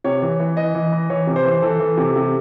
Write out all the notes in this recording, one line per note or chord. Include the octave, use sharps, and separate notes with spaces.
C3 C#5
E3
E3
E3 D#5
E3
E3
E3 C#5
C3
C5
E3
C5
E3 A4
E3
C3
C3